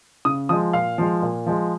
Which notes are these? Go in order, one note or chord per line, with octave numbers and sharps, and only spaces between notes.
C#3 D#6
F3 G#3 D#6
A#2 F5
F3 G#3
A#2
F3 G#3